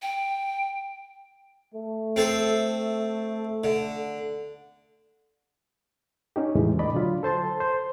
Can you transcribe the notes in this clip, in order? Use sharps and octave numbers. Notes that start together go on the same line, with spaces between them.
G5
A3
C4 A4 C5
D3
C#4 D#4 G4
E2 A2 C#3 E3 G#3
B2 D4 D5 D#5 B5
D3 F#3 F4
A4 C5 A5 C6
C5